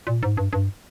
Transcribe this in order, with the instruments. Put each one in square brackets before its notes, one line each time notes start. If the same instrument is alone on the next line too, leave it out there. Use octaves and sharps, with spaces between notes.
[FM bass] A#2
G#2
G2
G2